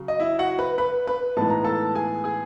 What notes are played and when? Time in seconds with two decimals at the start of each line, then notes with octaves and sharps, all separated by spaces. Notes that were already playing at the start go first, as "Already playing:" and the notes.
Already playing: C#3 F#3
0.08 D#5
0.20 E4 E5
0.39 F#4 F#5
0.59 B4 B5
0.78 B4 B5
1.07 B4 B5
1.37 A2 E3 G#3 B3 D#4 A5
1.50 A#5
1.64 A4 A5
1.95 G#4 G#5
2.24 G#4 G#5